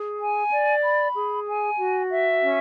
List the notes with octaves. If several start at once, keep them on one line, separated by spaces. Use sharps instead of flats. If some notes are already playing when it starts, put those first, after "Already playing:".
Already playing: G#4
G#5
D5
B5
G#4
G#5
F#4
E5
C#4